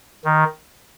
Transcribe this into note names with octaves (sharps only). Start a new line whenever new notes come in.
D#3